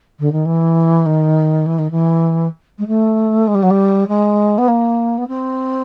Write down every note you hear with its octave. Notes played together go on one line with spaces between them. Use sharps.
D3
D#3
E3
D#3
E3
D#3
E3
G#3
A3
G#3
G3
F#3
G3
G#3
B3
A#3
B3
C4